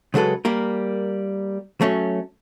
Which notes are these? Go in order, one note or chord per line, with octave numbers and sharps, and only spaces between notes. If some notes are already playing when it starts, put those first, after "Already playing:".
C#3 F#3 G#3 A4 B4
G3 A#3 A#4
F#3 A3 C#4